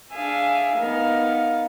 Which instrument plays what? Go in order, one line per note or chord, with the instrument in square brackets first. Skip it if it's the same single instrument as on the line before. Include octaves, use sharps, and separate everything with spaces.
[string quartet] D4 G#4 E5 F5 G#5
B3 D#4 A#4 F5